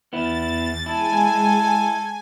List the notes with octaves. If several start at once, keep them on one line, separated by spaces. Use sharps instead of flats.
E2 B3 E4 A6
G#3 E4 A4 G#5